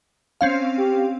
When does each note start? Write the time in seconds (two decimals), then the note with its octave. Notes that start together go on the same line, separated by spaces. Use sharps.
0.41 C4 C#4 F5
0.78 G4